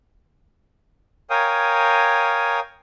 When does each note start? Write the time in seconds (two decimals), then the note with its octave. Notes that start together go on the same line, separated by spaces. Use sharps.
1.30 A#4 C#5 F5 G5 G#5 D#6